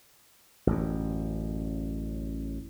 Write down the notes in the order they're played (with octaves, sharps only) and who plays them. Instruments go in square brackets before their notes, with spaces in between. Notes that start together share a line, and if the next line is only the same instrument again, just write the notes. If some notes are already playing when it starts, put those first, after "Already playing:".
[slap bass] A1 F#2